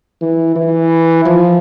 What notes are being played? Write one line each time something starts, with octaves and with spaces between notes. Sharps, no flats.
E3
E3
F3